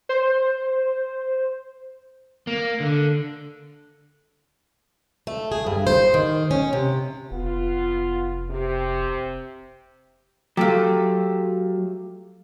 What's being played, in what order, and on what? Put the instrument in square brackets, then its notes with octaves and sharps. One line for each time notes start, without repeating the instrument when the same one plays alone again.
[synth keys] C5
[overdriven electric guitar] A#3
D3
[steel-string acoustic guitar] A3
G#4
G2
C5
D#3
C#4
C3
[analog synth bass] F1 [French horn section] B3 F4
[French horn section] C3
[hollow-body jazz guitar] F#3 A3 [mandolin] F4 G4